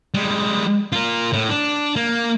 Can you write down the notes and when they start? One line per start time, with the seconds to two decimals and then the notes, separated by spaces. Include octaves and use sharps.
0.14 G3 G#3
0.92 F4 A#4
1.33 A2
1.49 D4
1.96 A#3